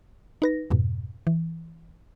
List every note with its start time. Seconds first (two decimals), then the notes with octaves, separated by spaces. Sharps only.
0.42 D#4 B4 A#6
0.70 F2 G#2 B2
1.27 E3